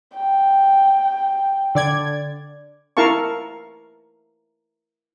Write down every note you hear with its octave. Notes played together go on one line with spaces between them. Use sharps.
G5
D3 D5 G#6
E4 A#4 F5 A5 C#6